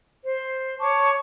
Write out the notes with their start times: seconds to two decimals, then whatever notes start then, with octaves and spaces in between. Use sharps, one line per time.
0.24 C5
0.80 C#5 A5 C#6 D6